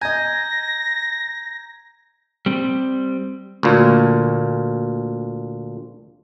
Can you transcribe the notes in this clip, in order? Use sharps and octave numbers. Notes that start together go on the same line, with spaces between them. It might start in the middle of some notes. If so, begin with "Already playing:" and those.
D#5 G#5 A#5 G6 G#6 A#6
G3 C4
D2 A#2